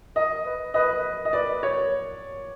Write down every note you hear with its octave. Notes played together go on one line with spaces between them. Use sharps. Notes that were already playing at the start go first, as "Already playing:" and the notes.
A#4 D#5
B4
B4 D#5
D#5
B4 D5
C#5